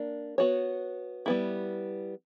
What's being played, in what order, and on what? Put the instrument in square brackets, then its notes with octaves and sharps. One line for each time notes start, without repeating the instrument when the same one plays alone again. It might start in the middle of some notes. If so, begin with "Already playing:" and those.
Already playing: [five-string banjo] A#3 D4
B3 F#4 C#5
G3 B3 E4